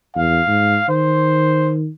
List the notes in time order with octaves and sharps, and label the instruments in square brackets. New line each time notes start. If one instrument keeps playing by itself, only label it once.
[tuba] E2 [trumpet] F5
[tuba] G#2
[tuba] D#3 [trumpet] C5